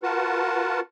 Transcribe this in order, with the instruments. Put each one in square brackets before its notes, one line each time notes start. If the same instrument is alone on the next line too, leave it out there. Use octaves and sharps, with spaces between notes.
[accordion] F4 F#4 A#4 B4 F#5 A5